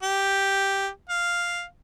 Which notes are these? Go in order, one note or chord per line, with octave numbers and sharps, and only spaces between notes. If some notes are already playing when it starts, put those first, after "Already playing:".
G4
F5